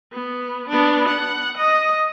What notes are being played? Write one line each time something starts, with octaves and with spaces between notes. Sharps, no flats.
B3
B3 D4
F#5
D#5